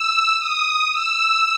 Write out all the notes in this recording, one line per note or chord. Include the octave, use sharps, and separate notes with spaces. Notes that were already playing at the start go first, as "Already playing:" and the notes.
Already playing: E6
D#6
E6